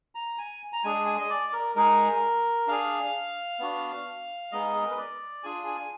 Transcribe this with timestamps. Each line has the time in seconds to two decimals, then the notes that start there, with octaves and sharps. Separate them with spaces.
0.15 A#5
0.38 G#5
0.73 A#5
0.84 G#3 D4 G#4 G#5
1.06 G#5
1.19 D#5
1.30 D5
1.53 A#4
1.76 G#3 D#4 G#4 A#4
2.67 D4 G#4 F5
3.59 B3 D4 F#4
4.52 G#3 B3 D#4 G#4 D#5
4.75 G#4
4.83 A#4
4.91 B4
4.97 D5
5.43 D4 F4 G#4 G#5
5.66 G#5